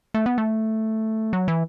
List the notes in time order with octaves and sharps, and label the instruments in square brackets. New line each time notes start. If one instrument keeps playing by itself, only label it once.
[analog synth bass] A3
B3
A3
F#3
E3